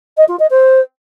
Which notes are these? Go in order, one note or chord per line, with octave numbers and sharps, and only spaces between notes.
D#5
F4
D#5
C5